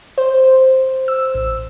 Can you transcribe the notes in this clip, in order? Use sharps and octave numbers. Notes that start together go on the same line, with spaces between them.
C5
E6
A1